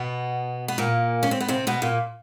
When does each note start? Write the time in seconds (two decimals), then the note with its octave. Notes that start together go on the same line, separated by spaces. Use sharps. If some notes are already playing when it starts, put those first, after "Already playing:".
Already playing: B2 B3
0.68 B3
0.78 A#2 A#3
1.23 C#4
1.31 C4
1.40 B3
1.48 C3 C4
1.67 B2 B3
1.82 A#2 A#3